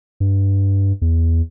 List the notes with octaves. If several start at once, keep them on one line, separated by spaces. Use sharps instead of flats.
G2
E2